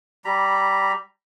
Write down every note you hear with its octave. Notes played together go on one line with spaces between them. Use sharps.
G3 A#5 B5